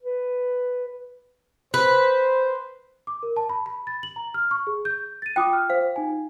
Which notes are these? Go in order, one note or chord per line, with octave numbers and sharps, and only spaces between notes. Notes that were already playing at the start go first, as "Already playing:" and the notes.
B4
B4 C5
D6
A#4
A5
B5
B5
A6
F#7
A#5
F6
C#6
G#4
G6
A6 D#7
F4 G5 D6 D#6 F#6
F6
C5 F5
D#4 G#5